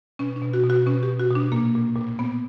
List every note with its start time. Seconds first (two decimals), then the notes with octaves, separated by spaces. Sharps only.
0.19 B2 C#4
0.36 D4
0.42 B2
0.54 F#4
0.63 B2
0.70 F#4
0.86 B2 C#4
1.03 G4
1.08 B2
1.19 F#4
1.31 B2 D4
1.52 A#2 A#3
1.75 A#2
1.96 A#2
2.19 A#2 B3